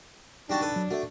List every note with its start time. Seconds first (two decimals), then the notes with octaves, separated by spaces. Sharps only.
0.50 G3 D4 D#4 F#4 G5 A5
0.61 A4 B4
0.76 F#3
0.91 A3 F#4 E5